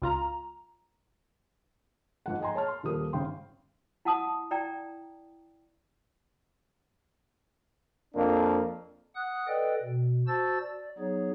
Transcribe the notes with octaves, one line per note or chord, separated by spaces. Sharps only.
C#2 F4 A#5
G#2 F3 F#5
D#5 G5 G#5 A#5 C6
C#5 A5 A#5 F6
C6
D#1 F3 A#3 G4 D#6
G#1 C#3 G5 C6
E4 F#5 A5 D#6
E4 D5 G5 A#5
F2 A#3 D4
F#5 D#6 F#6
A4 B4 D5 D#5 G5
B2
F#4 C5 A5 E6 A6
D5
F#3 B3 D#4 G#4 C#5